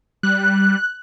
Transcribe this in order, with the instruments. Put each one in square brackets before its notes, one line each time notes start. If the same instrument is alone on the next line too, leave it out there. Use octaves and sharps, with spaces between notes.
[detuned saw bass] G3 [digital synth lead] F#6